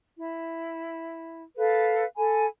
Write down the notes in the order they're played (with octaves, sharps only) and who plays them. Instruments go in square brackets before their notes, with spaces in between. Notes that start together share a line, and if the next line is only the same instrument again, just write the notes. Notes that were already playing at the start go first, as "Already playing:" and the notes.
[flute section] E4
A4 B4 F5
A4 G#5 B5